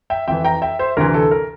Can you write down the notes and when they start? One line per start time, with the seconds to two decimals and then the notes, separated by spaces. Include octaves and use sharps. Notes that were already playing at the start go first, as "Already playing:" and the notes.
0.10 E5 G5
0.28 F2 E3 E5 G5
0.45 G5 A#5
0.62 E5 G5
0.79 C5 E5
0.97 D2 C3 E3 A#4
1.14 A4
1.31 A#4